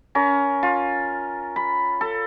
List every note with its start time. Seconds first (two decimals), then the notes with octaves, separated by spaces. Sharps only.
0.15 C#4 A#4
0.63 F4
1.56 B5
2.01 A4